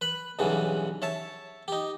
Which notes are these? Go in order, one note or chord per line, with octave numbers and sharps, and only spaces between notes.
B4 B5
B1 G2 C#3 E3 F#3
C#5 E5 A5
D#4 G4